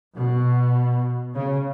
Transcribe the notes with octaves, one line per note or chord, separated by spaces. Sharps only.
B2
C#3